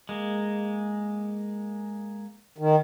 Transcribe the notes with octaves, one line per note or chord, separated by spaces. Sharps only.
G#3 A#3
D#3